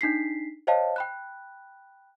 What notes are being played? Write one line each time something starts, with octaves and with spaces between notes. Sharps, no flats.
D4 D#4 B6 C7
C5 C#5 D#5 F5 G5 A5
G5 B5 F#6